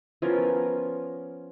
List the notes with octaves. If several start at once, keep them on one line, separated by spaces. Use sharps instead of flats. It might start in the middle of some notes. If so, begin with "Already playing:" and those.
F3 B3 C#4 A#4